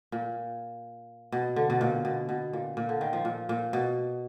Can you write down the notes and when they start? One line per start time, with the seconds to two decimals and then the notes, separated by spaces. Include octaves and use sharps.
0.12 A#2
1.32 B2
1.56 D3
1.70 B2
1.81 A#2
2.05 B2
2.29 B2
2.53 A#2
2.77 A#2
2.89 D3
3.01 D#3
3.13 F3
3.25 A#2
3.49 A#2
3.73 B2